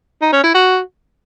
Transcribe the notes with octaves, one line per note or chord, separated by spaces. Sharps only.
D#4
C#4
E4
F#4